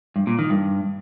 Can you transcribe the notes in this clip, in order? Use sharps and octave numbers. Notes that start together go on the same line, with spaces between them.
G2
A#2
D#3
G2